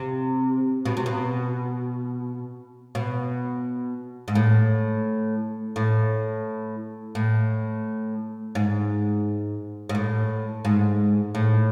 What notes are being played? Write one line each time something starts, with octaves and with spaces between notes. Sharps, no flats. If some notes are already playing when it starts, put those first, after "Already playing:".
Already playing: C3
B2
C3
B2
B2
G#2
A2
A2
A2
G#2
G#2
A2
G#2
A2